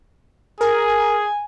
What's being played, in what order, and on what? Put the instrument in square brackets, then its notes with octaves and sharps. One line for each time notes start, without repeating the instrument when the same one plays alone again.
[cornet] G#4 [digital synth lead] A#4 [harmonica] G#5